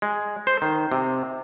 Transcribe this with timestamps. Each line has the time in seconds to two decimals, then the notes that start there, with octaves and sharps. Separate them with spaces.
0.02 G#3
0.47 C5
0.62 D#3
0.92 C3